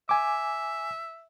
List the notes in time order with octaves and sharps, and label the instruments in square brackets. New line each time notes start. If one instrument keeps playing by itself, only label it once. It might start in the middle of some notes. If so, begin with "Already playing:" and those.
[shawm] E5 [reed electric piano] G#5 D6